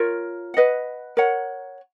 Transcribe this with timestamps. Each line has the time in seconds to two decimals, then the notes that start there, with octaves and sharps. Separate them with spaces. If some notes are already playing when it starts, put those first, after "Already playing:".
Already playing: F4 A#4 C#5
0.54 B4 D#5 F#5
1.17 A#4 C#5 F#5